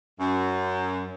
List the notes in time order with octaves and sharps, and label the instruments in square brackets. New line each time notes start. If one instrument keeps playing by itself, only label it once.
[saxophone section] F#2